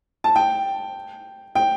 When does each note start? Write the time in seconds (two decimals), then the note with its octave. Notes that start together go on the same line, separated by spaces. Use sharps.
0.24 A5
0.36 G5
1.55 G5